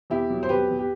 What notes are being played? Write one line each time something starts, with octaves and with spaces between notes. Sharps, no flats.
E2 E4 G4
F#3
C5
E2 G4 B4
E2
G4